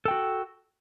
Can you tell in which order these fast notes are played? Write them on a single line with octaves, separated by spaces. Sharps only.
A4 G5 F#4